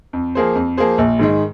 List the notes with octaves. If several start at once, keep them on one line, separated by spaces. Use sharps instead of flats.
F2
F3 A#3 G#4 C5
F2
F3 A#3 G#4 C5
A#1
G#2 D#3 G#3